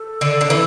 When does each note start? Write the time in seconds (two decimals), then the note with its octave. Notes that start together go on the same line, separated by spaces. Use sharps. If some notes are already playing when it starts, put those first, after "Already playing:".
Already playing: A4
0.21 D3
0.41 D3
0.50 E3